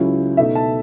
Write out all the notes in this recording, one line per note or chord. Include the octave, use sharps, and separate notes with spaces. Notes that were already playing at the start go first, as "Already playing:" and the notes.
Already playing: C#2 C#3 F#3 C#4 E4
B2 A3 D#4 E5
A5